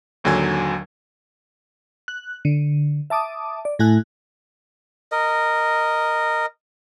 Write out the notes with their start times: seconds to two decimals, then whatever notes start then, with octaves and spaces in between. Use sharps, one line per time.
0.24 G#1 D#2 D3 F#3 G#5 G#6
2.08 F#6
2.45 D3
3.10 E5 A5 D6 D#6
3.65 D5
3.79 A2 A3 E4 G#5 F#6
5.12 A#4 D#5